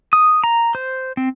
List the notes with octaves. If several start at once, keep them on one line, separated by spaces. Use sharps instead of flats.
D#6
A#5
C5
C4